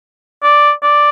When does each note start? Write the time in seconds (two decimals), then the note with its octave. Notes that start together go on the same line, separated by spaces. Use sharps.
0.43 D5
0.83 D5